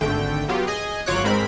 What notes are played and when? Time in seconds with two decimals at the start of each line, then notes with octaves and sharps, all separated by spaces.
0.01 G#1 D3 A3 G5
0.48 F#3 B3 F4 G4
0.67 G#4 D#5 G#5
1.06 G#1 F#3 F4 C#5 D6 F#6
1.24 G#2 G#3 C4 A#4 B5